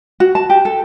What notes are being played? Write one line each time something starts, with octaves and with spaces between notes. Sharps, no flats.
F#4
A5
G4
A4